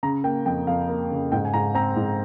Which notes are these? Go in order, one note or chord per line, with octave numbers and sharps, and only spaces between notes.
C#3 A#5
A#3 G5
F2 G5
F2 F5
A#3
C#3
G#2 G5
G#5
G#2 A#5
C4 A#5
G#2